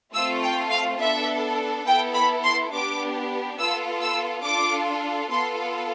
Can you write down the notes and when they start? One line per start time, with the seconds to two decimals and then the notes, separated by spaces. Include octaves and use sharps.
0.14 A3 C4 F4 A4 E6
0.43 G5
0.70 F5
0.99 B3 D4 A4 E5
1.85 B3 E4 A4 G5
2.14 B5
2.43 C6
2.72 B3 D4 G4 D6
3.58 B3 F4 A4 E6
4.01 E6
4.44 D4 F4 A4 D6
5.30 B3 F4 A4 C6